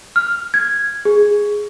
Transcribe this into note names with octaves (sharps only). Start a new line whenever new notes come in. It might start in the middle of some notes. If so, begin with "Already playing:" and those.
F6
G#6
G#4